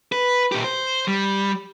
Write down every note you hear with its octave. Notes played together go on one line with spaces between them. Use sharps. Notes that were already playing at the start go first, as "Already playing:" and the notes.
B4
A#2 G4
C5
G3